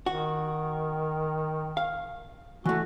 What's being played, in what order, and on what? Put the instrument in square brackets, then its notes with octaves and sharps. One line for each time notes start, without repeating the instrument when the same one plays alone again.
[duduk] D#3 [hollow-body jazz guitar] F#4
[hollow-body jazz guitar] F5
[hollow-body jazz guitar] E3 A3 [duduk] F#4